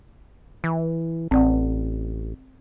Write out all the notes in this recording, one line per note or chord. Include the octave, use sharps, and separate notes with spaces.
E3
A1 C4 D5 F#5